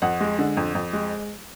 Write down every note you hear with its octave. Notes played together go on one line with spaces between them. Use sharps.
F2 F#5
G#3
D3
F2
F2
G#3